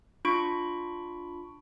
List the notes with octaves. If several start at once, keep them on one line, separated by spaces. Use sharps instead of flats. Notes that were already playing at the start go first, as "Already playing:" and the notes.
D4 F4 B5 C#6 D7